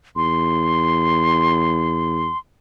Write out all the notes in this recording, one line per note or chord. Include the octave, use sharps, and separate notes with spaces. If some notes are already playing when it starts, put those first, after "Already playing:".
E2 C6